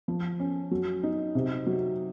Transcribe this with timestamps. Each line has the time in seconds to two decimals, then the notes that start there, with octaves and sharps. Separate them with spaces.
0.08 F3
0.40 C#4
0.71 F#3
1.03 D#4
1.35 C3
1.66 F#3